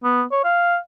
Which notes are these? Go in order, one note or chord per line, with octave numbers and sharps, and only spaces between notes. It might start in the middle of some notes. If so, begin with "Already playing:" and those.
B3
C#5
F5